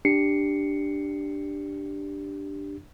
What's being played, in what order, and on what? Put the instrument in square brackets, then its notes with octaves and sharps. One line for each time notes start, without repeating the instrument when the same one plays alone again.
[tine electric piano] D4 G4 C7 C#7